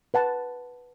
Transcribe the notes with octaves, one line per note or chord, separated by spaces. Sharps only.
B4 F#5 A5